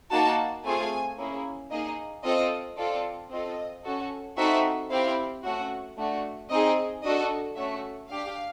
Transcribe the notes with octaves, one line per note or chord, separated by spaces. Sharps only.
A#3 D#4 F#4 A5
A3 C4 F4 G#4 G#5
A#3 C#4 E4 G#4
A#3 D#4 G#4 D#5
C4 F4 A4 D#5
C4 F4 A4 D5
C4 F4 A4 D#5
C#4 F#4 A4
C4 D#4 F#4 A4 E5
C4 E4 G4 F5
A3 C#4 F#4 F#5
A3 D4 F#4
C4 D#4 G#4 D#5
D4 F#4 A4 D#5
A3 C#4 F#4 E5
D4 G4 F5